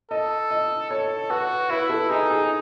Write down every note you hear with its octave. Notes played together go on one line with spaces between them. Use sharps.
A4 D#5
D#5
A4 C#5
F#4 B4
E4 B4
A4
D#4 G#4
G#4